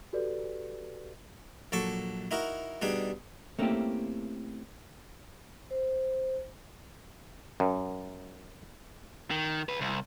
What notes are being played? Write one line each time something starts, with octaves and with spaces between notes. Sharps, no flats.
F#4 G4 A4 B4 D5
A#1 F#3 A4 A5 C#6 D6
D#4 E4 F#4 A#4
B2 G3 D4 D#4 G#4
A3 A#3 C4 C#4 E4 G4
C5
F#2
D#3
C#2 B4
C2